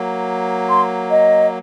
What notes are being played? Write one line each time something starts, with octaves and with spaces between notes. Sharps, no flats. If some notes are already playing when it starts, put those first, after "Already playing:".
Already playing: F#3 A#3
C6
D#5